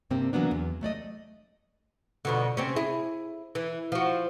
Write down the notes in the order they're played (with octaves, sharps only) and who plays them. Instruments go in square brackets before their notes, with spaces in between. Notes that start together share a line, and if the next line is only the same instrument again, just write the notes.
[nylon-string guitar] G2 C3 A#3 C4
E3 F#3 A#3 B3 D4
E2
F#3 A3 D5 D#5
[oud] F2 B2 D3
C3 C4 C#4
E4 G#4
E3
F3 F#4